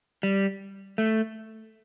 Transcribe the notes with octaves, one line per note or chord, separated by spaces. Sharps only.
G3
A3